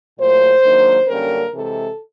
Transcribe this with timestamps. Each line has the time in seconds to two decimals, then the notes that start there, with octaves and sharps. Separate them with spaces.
0.19 A#2 F#3 A3 C5
0.63 G#2 D#3 F#3 A#3 D4
1.08 F#2 D3 G3 A#3 C#4 A#4
1.53 C3 E3 G#3 A4